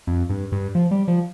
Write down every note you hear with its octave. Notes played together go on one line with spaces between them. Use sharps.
F2
G2
G2
F3
G3
F3